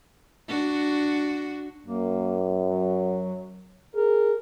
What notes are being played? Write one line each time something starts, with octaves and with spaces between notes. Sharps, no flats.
D4 F#4
F#2 A#3
F#3
G#4 A#4